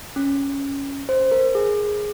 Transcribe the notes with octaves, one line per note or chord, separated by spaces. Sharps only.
C#4
C5
A#4
G#4